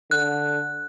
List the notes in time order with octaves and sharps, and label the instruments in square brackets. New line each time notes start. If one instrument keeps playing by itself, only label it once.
[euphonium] D3 [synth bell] F#6